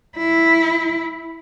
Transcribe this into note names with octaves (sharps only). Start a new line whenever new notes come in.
E4